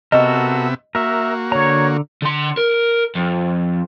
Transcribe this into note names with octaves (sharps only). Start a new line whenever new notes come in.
C3 B3 F#4 A4 A#4 D#5 E5
A#3 F#4 A#4 E5
D3 C#5 A#5
D3 C6
A#4
F2